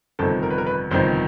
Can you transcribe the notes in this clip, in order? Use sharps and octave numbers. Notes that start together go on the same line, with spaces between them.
G1 F2 C3 D#3 A4
A#4
B4
A#4
B4
G1 F2 C3 D#3 C5